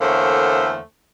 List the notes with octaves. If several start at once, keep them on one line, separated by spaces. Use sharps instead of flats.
E2 D3 A3 A#3 C5 C#5